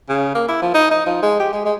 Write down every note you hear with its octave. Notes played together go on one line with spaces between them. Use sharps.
C#3
A#3
E4
F3
D#4
D#4
F3
G#3
G4
G#3
G#3